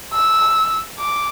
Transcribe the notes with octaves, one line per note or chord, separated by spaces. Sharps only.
E6
D6